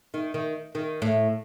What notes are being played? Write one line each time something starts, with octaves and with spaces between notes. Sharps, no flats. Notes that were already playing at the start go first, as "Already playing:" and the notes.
D#3
D#3
D#3
A2